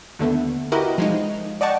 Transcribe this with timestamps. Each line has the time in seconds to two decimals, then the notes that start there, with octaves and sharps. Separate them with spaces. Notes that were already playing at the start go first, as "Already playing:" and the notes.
0.19 D#2 D3 A3 B3
0.72 E4 F#4 G4 A#4 B4 D#5
0.98 F3 G#3 D#4
1.61 D5 D#5 F#5 G5 A5 C#6